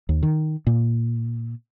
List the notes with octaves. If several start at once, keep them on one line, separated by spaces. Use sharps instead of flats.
D#2
D#3
A#2